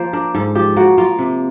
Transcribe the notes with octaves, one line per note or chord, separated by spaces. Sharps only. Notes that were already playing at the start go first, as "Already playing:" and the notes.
Already playing: F3 A#3 C5
D4 A#4
G#2 A4
F3 G4
A#3 F#4
A#3 F4
C3